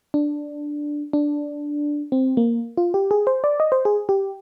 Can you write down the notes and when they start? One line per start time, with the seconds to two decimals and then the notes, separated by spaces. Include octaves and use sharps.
0.14 D4
1.13 D4
2.12 C4
2.37 A#3
2.77 F4
2.94 G4
3.11 G#4
3.27 C5
3.44 D5
3.60 D#5
3.72 C5
3.85 G#4
4.09 G4